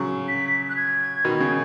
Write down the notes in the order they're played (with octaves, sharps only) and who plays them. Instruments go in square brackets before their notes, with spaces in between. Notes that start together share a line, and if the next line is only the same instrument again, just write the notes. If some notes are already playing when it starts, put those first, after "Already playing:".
Already playing: [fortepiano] C#3 F#3
[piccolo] B6
F#6
G#6
[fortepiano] B2 D#3
C#3